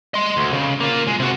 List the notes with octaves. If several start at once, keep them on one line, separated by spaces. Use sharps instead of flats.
D#5 C6
D2
C#3
A#3 F4
G#3
C3 F#4